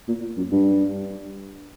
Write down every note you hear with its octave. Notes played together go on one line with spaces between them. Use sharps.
A#2
F#2
G2